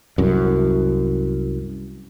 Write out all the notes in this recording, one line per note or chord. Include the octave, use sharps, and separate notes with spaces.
C2 F#2